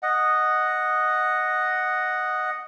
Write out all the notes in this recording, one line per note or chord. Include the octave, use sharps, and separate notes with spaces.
D#5 F#5